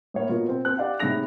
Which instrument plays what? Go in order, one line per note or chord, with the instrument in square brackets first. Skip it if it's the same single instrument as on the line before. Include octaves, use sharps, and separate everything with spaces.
[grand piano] A2 A#3 C#5
B2 F4 A#4
C4
C4 F#6
G4 D5 F5 F#5
A2 C3 D#4 G#4 A#6 F7